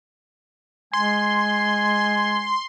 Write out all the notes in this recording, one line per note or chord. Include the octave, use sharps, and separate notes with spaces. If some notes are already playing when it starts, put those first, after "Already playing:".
G#3 G#5 C6